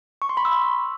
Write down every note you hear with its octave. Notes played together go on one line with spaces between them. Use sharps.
C#6
C6
B5
E6